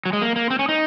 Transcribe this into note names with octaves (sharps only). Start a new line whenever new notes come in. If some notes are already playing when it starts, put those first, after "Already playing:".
F#3
G#3
A#3
A#3
C4
C#4
D#4